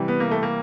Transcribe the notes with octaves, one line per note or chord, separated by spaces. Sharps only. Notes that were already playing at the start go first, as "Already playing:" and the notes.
Already playing: C3 E3 G3
B3
A#3
A3
A#3